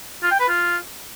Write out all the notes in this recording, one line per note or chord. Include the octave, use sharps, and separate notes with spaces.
F4
G5
B4
F4